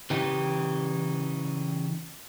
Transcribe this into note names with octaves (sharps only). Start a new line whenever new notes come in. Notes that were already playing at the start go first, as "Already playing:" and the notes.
C#3 E3 D#4 G4